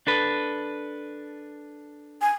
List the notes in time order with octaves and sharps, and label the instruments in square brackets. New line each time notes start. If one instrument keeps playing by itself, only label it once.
[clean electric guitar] D4 A4 B4
[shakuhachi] G#5